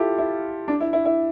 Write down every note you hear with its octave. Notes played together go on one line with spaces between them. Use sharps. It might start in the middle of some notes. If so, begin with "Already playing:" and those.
Already playing: E4 F4 G4 A4
E4
D4
E4
E4
E4